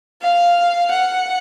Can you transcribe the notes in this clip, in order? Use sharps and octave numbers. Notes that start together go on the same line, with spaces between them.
F5
F#5